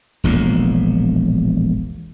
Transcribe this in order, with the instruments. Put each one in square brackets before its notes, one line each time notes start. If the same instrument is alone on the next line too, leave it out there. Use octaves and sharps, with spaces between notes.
[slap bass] E1 A#1 A2